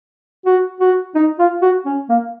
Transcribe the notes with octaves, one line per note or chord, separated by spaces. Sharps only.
F#4
F#4
D#4
F4
F#4
C#4
A#3